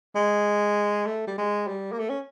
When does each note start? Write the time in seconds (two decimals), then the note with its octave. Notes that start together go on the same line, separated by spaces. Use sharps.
0.15 G#3
1.06 A3
1.27 G3
1.38 G#3
1.68 G3
1.92 A#3
1.99 A3
2.09 C#4